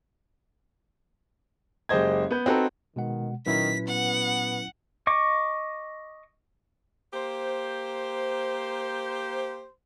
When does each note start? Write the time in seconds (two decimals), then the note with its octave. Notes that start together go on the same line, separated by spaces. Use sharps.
1.89 F#1 G#3 G4 C5 D#5 G#6
2.31 B3 B4 G6
2.46 C4 D#4 F#4 A4 B4 A#5
2.96 B2 D#3 G#3 F#5
3.46 A#2 D#3 F#3 C#4 E4 B4 B6
3.88 B3 F#5
5.07 D#5 C#6 D6
7.13 A#3 G4 C5